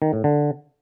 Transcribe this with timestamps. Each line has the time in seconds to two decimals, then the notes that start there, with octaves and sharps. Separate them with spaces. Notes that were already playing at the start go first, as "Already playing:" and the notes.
0.02 D#3
0.13 A2
0.24 D3